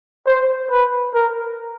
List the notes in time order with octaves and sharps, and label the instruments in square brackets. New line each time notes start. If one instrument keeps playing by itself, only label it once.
[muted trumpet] C5
B4
A#4